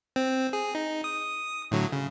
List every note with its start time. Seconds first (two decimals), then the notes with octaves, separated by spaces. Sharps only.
0.16 C4
0.53 G#4
0.75 D#4
1.04 D#6
1.71 A2 D3 F#3
1.92 C#3